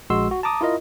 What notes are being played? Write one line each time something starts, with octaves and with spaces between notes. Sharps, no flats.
A#1 G#3 F#4 C6 E6
F#4
A5 A#5 D6 D#6
E4 F4 A#4 D#5